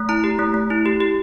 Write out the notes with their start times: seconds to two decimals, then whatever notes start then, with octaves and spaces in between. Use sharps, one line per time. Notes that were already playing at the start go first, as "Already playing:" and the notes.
Already playing: A3
0.09 E4 A#5
0.24 G4
0.39 A3
0.54 A3
0.70 E4
0.86 G4
1.00 G4